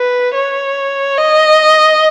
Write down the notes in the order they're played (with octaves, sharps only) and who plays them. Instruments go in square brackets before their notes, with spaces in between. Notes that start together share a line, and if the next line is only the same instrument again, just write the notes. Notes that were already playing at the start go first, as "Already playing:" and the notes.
Already playing: [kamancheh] B4
C#5
D#5